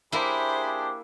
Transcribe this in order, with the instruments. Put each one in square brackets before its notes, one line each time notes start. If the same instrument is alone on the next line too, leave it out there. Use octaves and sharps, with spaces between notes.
[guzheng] A#3 E4 [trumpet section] D4 G4 G#4 [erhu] C5 [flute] B5